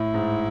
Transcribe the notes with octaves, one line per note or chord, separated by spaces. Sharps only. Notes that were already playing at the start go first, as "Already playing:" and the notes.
Already playing: A2 E4
G#2